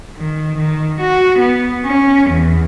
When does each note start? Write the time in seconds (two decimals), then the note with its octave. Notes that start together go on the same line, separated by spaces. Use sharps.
0.16 D#3
0.58 D#3
1.00 F#4
1.39 B3
1.85 C#4
2.30 E2